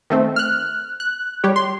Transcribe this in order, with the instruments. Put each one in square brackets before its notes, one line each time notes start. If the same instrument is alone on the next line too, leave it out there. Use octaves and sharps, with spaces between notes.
[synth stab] D#3 A3 C4
F6 F#6
F#6
G3 G4 C#5
C6